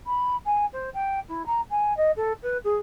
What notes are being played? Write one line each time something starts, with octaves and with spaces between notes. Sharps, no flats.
B5
G#5
C5
G5
E4
A#5
G#5
D#5
A4
B4
G#4